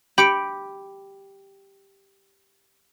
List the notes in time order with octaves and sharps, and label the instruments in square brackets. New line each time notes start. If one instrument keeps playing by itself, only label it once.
[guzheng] G4 [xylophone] B5 C#7 D7